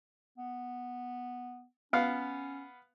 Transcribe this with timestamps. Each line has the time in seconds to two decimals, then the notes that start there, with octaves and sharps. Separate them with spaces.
0.38 B3
1.93 B3 C#4 F5